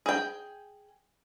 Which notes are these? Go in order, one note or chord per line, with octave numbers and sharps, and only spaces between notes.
G#4 G5